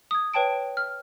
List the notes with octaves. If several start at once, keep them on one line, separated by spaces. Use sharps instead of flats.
D#6 G#6
B4 C#5 G5 A5 D7
F6